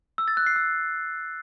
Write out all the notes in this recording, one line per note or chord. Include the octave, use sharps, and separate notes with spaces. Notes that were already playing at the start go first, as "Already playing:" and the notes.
E6
A6
F#6
C7
E6